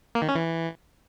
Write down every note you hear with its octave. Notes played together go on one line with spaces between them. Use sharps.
A#3
D#3
C#4
E3